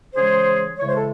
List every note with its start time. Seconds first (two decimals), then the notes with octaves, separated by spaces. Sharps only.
0.15 C#3 E3 G#3 G#4 C5
0.79 C#3 E3 G#3 C#5
0.89 C5
0.97 A4